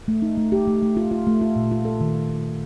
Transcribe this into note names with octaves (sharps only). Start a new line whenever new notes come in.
A3
D#4
A3
G4
A3
A3
F4
F4
A3
F4
A#2
F4
A4
D#3